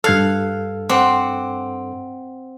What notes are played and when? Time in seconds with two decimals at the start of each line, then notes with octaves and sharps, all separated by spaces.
0.04 G2 A4 F5 F6 F#6 G#6
0.89 C4 F#5 D6